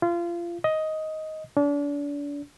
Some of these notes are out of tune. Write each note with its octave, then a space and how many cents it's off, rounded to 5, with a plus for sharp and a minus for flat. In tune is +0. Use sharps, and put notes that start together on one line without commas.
F4 -25
D#5 +10
D4 -35